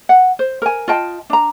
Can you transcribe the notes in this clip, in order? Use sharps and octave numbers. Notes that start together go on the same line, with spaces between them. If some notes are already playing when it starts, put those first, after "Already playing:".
F#5
C5
A#4 G#5
F4 D#5 G5 A5
D4 A#5